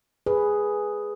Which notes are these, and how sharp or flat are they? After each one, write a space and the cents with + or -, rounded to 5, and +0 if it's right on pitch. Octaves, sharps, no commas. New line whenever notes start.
G#4 +0 B4 +0